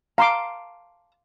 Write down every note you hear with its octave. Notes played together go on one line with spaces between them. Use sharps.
F5 A5 A#5 C6 D6